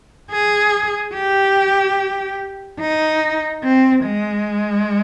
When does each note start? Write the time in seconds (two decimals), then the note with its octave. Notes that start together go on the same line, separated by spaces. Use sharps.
0.31 G#4
1.14 G4
2.80 D#4
3.63 C4
4.04 G#3